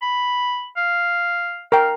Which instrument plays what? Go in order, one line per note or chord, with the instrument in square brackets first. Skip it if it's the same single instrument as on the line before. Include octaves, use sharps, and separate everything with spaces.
[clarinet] B5
F5
[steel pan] A#4 G5 [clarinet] F5